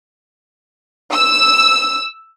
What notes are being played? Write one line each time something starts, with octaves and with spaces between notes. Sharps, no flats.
E6